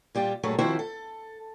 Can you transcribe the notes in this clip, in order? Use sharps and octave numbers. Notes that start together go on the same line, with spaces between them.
A#2 G3 F4 G4
G2 A#2 F#3 A3 G#4 C#5
D#3 F3 C4 E4 F#4 C5
A4